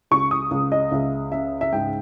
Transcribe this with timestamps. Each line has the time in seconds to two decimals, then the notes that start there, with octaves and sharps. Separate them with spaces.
0.11 C#2 C#6
0.31 D#6
0.51 C#2
0.72 D#5
0.92 C#2 E5
1.32 C#3 E5
1.61 E5
1.72 G#2 G5